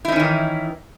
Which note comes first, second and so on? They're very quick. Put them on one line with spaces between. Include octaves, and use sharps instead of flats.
E4 D#4 C#4 D#3 E3